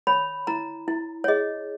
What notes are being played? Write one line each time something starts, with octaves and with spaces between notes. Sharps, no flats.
C#5 B5
E4 A#5
E4
C#5
G#4 D#5